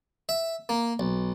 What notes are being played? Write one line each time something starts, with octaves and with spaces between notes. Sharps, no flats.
E5
A#3
B1